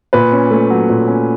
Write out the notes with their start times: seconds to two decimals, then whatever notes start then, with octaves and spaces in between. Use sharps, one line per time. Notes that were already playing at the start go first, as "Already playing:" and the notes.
0.13 A#2 B4
0.32 C#4
0.51 A3
0.70 F#3
0.89 A#2
1.08 C#4